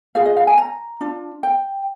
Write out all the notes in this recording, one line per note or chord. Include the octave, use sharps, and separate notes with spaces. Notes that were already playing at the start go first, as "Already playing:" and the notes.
F4 G#4 F5
D#5
F5
G#5
A#5
D4 F4
G5